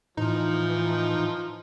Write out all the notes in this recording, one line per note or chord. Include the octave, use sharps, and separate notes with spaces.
A2 E3 F3 D#4